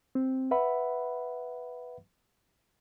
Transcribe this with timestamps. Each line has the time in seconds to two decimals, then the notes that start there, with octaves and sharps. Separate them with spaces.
0.15 C4
0.51 B4 E5 F#5 B5